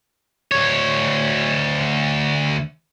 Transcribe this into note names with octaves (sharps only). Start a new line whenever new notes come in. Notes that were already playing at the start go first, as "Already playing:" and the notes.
D2 C#5